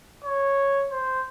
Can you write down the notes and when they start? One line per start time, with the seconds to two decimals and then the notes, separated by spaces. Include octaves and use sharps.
0.24 C#5
0.91 C5